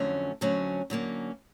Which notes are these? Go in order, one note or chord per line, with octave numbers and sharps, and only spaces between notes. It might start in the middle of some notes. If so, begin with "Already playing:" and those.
Already playing: F2 D3 F#3 A3 C#4
F2 D3 F#3 A3 C#4
D3 F#3 A#3 C#4